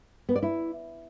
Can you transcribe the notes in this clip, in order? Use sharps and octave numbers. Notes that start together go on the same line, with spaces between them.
B3
D5
E4